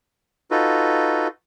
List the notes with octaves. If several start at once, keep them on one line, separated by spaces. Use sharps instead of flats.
D#4 F4 F#4 A4 B4